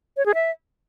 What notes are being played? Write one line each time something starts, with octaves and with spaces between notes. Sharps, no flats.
C#5
G#4
E5